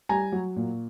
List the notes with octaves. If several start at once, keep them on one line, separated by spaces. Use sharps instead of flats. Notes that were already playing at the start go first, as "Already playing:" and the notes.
G3 G#5 A#5
F#3
A#2